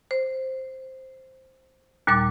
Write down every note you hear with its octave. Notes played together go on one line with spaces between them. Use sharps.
C5
D#2 A#2 G3 D6 A6